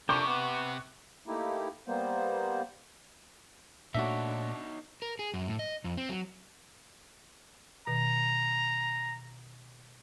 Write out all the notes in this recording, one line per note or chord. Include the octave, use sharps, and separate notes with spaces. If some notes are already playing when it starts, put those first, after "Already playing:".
F2 C3 D4 A#4 G5 C#6 D6
B3 F#5
A3 A#3 D#4 E4 G4
G3 A#3 B3 C5
A#2 A3 D4 D#4 F#4 C#5 E5
A#4
G#4
F#2
A2
D#5
F2
C4
F#3
B2 D#3 A#5